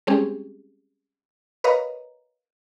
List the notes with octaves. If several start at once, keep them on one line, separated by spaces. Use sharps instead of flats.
G3 G#3 C4 C#4 G4 G#4
A#4 B4 C#5 D#5 F5 A#5